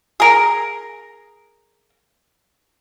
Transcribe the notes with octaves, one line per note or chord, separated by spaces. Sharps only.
G#4 A#4